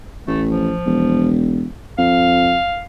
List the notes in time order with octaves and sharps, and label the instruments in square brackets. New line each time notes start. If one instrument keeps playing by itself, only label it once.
[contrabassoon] A1 [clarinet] A3
[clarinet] F3
[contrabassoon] E1
[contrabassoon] F2 [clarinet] F5